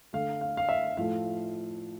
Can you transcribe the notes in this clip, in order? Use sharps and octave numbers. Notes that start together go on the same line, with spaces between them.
D3 A3 F5
F5
F5
E5
A2 F3 A3 F5